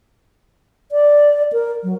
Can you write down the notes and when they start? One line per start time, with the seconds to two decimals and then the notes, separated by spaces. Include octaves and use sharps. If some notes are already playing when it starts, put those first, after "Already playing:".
0.92 D5
1.53 A#4
1.83 F#3